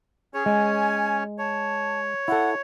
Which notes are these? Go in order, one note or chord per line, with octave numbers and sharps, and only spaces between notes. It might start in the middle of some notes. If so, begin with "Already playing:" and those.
C#4 G#4 C#5
G#3 G#5
C#5 A5
E4 A4 F#5